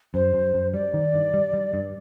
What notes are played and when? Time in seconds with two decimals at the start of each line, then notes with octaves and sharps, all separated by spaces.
0.14 F#2 C5
0.34 F#2
0.54 F#2
0.73 G3 D5
0.94 D#3
1.14 G2
1.34 G3
1.54 G3
1.74 G2